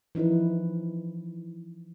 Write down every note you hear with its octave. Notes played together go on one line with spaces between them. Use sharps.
E3 F3 D#4 E4 B4